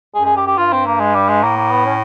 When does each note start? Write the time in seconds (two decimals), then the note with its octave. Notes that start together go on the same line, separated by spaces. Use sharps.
0.15 F#2 G#4
0.25 G#4
0.37 G4
0.47 G4
0.57 G2 F4
0.72 C4
0.86 A#3
1.00 G#3
1.15 G3
1.28 G#3
1.43 A2 A#3
1.57 A#3
1.70 B3
1.85 C#4